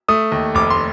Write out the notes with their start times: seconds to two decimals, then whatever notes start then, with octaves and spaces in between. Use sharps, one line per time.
0.09 A3 D#6
0.32 D#2
0.55 F1 D6
0.70 C6